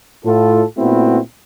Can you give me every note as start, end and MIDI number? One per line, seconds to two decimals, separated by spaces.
0.25 0.62 45
0.25 0.62 65
0.25 0.62 69
0.77 1.18 46
0.77 1.18 57
0.77 1.18 59
0.77 1.18 60
0.77 1.18 64
0.77 1.18 66